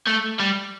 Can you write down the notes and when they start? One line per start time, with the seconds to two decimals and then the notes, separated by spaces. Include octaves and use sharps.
0.07 A3
0.40 G3